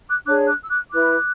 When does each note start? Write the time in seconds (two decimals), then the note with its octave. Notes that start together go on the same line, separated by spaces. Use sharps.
0.09 D6 F#6
0.26 D4 G#4 C#5 D6 F#6
0.47 D6 F#6
0.63 E6
0.70 D6 F#6
0.92 E4 B4 D6 F#6